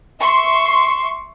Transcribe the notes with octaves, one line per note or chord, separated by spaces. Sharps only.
E5 C6 C#6